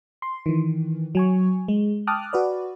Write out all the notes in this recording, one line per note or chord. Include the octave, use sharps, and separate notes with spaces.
C6
D#3 E3
F#3 G#5 C#6
G#3
G5 A5 D6 D#6 F6 F#6
F#4 B4 D5